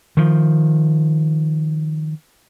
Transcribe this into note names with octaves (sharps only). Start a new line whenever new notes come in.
D#3 F3